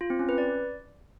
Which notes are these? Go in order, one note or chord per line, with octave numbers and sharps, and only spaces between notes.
F4
C4
C#4
B4
D5